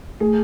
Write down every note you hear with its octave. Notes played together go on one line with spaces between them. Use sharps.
A3 G#4